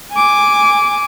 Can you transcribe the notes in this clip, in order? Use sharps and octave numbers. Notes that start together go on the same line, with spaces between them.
G#5 D6